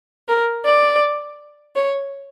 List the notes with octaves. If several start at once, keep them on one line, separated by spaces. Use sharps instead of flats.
A#4
D5
C#5